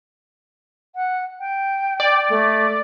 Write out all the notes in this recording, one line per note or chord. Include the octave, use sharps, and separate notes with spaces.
F#5
G5
D5
A3